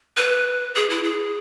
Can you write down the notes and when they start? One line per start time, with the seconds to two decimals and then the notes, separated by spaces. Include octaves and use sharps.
0.17 B4
0.75 G#4
0.90 E4
1.04 G#4